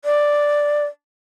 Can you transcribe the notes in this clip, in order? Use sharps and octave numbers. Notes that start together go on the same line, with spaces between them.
D5